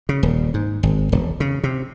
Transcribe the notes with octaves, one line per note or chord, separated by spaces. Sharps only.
C#3
D#1
G#2
G#1
E1
C#3
C3